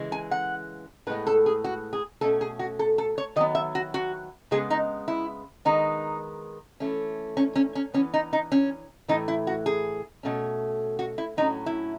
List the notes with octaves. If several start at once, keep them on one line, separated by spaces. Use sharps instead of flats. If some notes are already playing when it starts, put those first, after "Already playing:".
Already playing: C#3 E3 G#3
G#5
F#5
A2 G#3 B3 B4
A4
G#4
F#4
G#4
B2 A3 C#4 A4
G#4
F#4
A4
A4
C#5
D#3 F#3 B3 D#5
E5
F#4
F#4
C#3 G#3 B3 G#4
D#4
E4
D#3 G#3 B3 D#4
E3 A3 C#4
C#4
C#4
C#4
E3 B3 C#4
D#4
D#4
C#4
A2 E3 A3 D#4
E4
F#4
G#4
B2 A3 C#4
F#4
E4
A2 F#3 C#4 D#4
E4